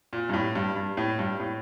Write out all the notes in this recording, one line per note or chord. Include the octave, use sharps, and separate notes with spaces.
A#2
G2
A2
G2
G2
A2
G2
A2